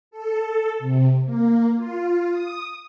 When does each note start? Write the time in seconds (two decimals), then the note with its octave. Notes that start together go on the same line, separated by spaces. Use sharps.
0.11 A4
0.79 C3
1.25 A#3
1.76 F4
2.31 D#6